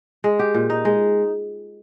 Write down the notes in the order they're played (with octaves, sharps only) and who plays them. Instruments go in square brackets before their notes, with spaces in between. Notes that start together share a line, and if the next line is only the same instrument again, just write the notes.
[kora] G#3
G4
A#2
D#4
G#3